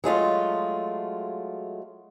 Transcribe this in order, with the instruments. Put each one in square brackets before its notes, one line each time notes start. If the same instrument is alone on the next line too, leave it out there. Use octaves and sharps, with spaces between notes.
[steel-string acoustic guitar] F#3 G#3 A3 F4